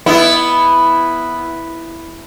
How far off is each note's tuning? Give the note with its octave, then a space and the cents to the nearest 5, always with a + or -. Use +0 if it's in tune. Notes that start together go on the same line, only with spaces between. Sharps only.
B3 +0 E4 +0